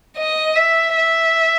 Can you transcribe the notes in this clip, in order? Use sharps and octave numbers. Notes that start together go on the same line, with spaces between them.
D#5
E5
E5